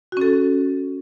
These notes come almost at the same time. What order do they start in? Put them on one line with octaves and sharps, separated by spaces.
F#4 C#4 A4